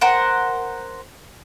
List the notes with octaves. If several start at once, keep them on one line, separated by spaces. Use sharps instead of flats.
A#4 C5 F#5